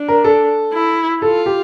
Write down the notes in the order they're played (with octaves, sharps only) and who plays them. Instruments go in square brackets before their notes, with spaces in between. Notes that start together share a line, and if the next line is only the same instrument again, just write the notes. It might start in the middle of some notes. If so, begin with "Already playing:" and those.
Already playing: [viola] D4
[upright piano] A#4
A4
[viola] E4
[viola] F4 [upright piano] A4
[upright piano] G4